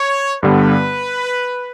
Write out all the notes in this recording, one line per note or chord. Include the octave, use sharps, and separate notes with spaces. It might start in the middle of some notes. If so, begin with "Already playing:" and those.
Already playing: C#5
G2 D3 G3 B3 B4